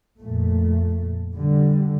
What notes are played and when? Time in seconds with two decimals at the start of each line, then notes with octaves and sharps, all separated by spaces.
0.17 F2 A#2 A3
1.34 D3 G3